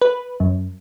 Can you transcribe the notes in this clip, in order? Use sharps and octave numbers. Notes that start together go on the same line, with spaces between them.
B4
F#2